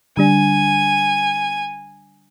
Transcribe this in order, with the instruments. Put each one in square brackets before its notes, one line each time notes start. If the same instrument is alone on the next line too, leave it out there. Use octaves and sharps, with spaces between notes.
[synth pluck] D3 G3 D4 [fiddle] G#5